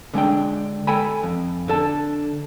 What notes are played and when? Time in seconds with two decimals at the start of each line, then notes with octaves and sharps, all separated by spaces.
0.14 D3 G#3 D4 G5
0.87 A4 G5 G#5 B5
1.23 F2
1.68 D3 A4 A5